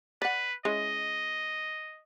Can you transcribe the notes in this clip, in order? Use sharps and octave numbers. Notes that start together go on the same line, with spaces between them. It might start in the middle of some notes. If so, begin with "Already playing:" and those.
B4 D5 F#5
G#3 C#4 E4 D#5